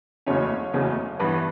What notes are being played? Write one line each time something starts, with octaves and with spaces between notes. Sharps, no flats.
F#1 E2 C#3 F#3 A3 C#4 C#5
F#1 E2 C#3 F#3 A3
G2 E3 B3 B4